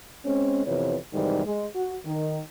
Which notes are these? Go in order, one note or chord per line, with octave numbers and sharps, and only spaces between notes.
G#3 C4 C#4
F2 C3 E3 B3 C#5
G#2 C3 D#3 E3 G3
G#3
F#4
D#3